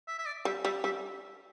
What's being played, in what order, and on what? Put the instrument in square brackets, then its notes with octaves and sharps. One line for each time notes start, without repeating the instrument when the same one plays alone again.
[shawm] E5
E5
D5
[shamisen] G3 [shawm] E5
[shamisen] G3 [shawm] E5
[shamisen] G3 [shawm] E5